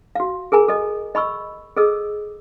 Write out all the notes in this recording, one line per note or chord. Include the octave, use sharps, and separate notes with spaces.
F#4 F5
G#4 A#4 G#5 A#5
A4 D#5
D#5 B5 C#6 E6
G#4 A4 D#5 E6